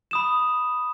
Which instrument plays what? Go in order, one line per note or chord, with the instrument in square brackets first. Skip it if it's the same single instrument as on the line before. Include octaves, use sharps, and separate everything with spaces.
[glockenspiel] B5 D#6 E7